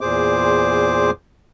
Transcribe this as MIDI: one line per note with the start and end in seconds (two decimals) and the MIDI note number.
0.01 1.11 40
0.01 1.11 46
0.01 1.11 68
0.01 1.11 72
0.01 1.11 86